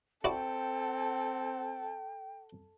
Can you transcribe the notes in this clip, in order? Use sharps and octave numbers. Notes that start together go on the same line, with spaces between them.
C4 E4 F#4 A4 D5 G5